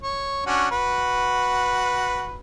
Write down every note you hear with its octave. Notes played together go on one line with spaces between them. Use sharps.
C#5
C#4 D4 F#4
F#4 B4